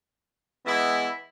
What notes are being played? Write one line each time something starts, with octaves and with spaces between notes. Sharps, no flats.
E3 G#3 B3 E4